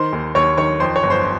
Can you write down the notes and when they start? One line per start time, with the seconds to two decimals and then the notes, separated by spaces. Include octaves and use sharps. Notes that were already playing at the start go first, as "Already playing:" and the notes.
Already playing: D#3 C5 C6
0.13 D#2
0.35 D#2 C#5 C#6
0.57 D#3 C#5 C#6
0.80 F2 C5 C6
0.96 C#5 C#6
1.03 G1
1.10 C5 C6